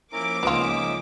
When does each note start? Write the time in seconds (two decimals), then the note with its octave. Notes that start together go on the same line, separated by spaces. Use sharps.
0.13 F3 A#3 C#4 E4 A#4 D6
0.43 C#2 B3 C#4 D#4 F4 E5